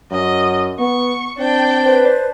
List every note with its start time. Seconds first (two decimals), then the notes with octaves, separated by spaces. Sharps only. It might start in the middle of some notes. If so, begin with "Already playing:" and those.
0.11 F#2 D#5
0.79 B3 C#6
1.38 C4 D4 G5
1.82 B4 C5